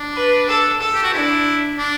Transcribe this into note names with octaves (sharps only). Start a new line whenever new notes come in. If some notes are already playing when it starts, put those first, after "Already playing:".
Already playing: D4
B4
A4
A4
G4
F#4
D4 E4
D4